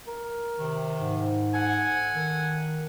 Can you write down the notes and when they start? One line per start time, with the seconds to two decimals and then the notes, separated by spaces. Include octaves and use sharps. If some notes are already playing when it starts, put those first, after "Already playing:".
0.07 A#4
0.58 C3 D#3
0.98 G#2
1.54 A4 F#5 G#5
2.14 D#3